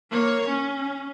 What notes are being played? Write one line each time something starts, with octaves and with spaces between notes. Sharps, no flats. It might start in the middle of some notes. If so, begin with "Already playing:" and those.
A#3 C#5
C#4